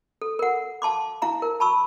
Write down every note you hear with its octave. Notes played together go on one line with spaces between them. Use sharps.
A4
A#4 F#5
F5 A5 C6 D6
E4 F5 A#5
A#4
A5 B5 C#6 E6